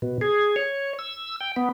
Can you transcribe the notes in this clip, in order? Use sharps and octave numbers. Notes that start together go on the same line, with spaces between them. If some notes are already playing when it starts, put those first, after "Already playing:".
B2
G#4
C#5
E6
G5
B3